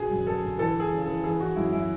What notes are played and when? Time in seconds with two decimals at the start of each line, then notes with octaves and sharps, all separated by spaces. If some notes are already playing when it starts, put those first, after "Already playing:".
Already playing: B2 D3 G#4
0.10 F#2
0.26 D3 A4
0.43 D3
0.58 E3 A4
0.75 E3 G#4
0.92 C#3
1.02 G#4
1.08 E3
1.24 E3 G#4
1.39 E3 F#4
1.55 F#2 E4
1.72 F#2 E4